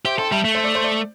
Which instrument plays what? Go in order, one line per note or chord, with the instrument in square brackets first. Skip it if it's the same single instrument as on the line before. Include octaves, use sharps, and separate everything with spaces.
[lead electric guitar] G4 [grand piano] C5 E5
[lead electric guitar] A4 [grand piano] G5 C6
[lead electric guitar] G3 [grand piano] E5 A5
[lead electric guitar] A3
[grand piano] C5 E5
D5
C5
D5